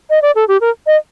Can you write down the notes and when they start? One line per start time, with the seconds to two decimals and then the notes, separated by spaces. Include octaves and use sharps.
0.10 D#5
0.22 D5
0.35 A4
0.48 G4
0.61 A#4
0.87 D#5